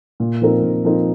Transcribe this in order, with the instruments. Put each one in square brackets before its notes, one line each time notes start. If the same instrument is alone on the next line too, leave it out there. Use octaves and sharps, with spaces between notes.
[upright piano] A#2
F3 C4 D#4 A#4
A#2
F3 C4 D#4 A#4